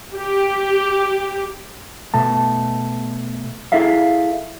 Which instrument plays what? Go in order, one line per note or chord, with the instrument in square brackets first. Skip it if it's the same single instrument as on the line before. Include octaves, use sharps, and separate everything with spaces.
[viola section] G4
[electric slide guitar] B2 A3 A5
E4 G#4 A4 E5 F5